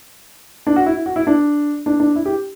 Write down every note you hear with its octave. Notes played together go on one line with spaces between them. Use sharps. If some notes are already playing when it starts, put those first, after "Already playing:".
D4
F#4
E4
F#4
E4
D4
D4
D4
E4
G4